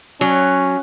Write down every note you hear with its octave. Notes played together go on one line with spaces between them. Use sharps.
F#3 C#4